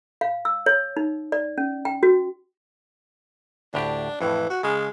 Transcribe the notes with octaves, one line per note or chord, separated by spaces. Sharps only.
F5
E6
C#5
D#4
D5
C#4
G5
F#4
D2 A2 D4 G4
F2 A2 E3
F#4
C#3 G#3